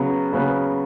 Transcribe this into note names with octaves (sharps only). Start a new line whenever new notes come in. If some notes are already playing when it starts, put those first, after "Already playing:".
Already playing: C#3 F#3 B3
C#3 F#3 B3